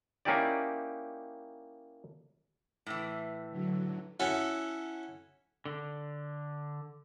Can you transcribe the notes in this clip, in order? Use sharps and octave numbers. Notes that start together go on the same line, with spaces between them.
A#3 C#4 D#4 E4 G4 D5
A2 E3
D3 F#3
C#4 E4 F#4 A4
D3